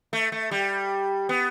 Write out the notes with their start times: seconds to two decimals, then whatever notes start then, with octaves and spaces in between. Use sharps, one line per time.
0.13 A3
0.32 A3
0.51 G3
1.29 B3